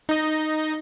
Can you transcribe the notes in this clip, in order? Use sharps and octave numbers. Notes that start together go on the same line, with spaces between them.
D#4 D#5